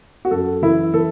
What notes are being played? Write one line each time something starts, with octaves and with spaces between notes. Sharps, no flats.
F#4
F#2 A4
E3 E4
E3 A4